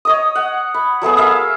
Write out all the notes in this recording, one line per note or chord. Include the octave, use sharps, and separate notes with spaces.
C#5 D#5 D#6
F#5
B5
F#3 A3 B3 G#4
A#4 E5 F5